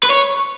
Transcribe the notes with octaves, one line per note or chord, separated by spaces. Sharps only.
B4
C#5